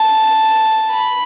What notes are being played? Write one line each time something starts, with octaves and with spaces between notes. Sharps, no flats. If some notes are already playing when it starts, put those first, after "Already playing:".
Already playing: A5
B5